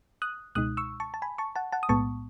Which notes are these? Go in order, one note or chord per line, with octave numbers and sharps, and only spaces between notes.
D#6 F#6
C#2 B2 G#3 D#4 D#6 F#6
C#6 E6
A5 C#6
A5
G#5 B5
A5 C#6
F#5 A5
F#5 A5
D#6
B1 A2 G#3 B3 A5 C#6